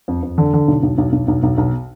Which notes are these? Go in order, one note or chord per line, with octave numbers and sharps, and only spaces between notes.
F2
F2
D3
D3
B1
B1
B1
B1
B1
B1
B1